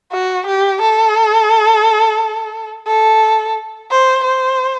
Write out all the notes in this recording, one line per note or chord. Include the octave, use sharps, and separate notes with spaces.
F#4
G4
A4
A4
C5
C5